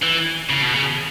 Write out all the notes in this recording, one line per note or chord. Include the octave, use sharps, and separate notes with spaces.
E3
C#3
B2
C#3